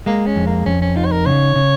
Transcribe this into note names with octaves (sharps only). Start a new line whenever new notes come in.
G#3 A#3
C#4
F2
A#3
F2 C#4
C#4
D#4 F4
C#5
A#4
C#3 C#5
C#3